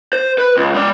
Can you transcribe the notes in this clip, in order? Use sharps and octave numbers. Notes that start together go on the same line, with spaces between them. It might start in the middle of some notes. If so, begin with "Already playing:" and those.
C5
B4
C#2
G#3 D5